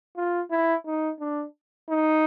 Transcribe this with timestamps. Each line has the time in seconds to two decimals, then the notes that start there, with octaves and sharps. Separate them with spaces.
0.17 F4
0.51 E4
0.86 D#4
1.20 D4
1.89 D#4